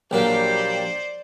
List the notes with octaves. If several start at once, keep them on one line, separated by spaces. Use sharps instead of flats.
A#1 F#3 G3 A#3 G4 C5 D5